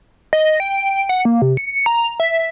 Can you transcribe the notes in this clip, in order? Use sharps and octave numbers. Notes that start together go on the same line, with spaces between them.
D#5
G5
F#5
A#3
C3
C#7
A#5
E5